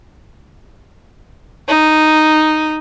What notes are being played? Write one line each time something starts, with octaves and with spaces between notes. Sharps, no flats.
D#4